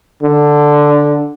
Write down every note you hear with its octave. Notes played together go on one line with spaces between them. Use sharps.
D3